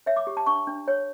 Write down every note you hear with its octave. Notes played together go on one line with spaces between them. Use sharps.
C#5 E5
D6
G4
A5
D4 C#6
D4
C#5